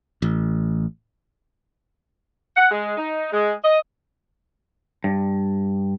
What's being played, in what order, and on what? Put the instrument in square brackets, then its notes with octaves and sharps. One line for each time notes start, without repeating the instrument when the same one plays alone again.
[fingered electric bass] A1
[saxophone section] F#5
G#3
D#4
G#3
D#5
[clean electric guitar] G2